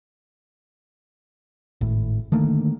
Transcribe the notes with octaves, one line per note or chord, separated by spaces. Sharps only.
G#1 A2
D3 D#3 A3 A#3